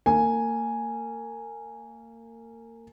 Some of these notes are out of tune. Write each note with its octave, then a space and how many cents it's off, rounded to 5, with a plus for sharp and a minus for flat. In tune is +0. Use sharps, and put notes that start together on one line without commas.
A#3 -30 G#5 +0